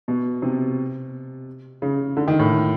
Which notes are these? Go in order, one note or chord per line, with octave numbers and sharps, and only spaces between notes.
B2
C3
C#3
D3
D#3
A2